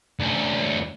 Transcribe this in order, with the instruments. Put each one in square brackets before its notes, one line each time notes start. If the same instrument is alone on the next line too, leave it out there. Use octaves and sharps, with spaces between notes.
[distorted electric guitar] D2 C#4